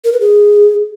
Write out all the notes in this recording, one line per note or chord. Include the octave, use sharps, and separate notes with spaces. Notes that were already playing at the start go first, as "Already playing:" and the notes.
A#4
B4
G#4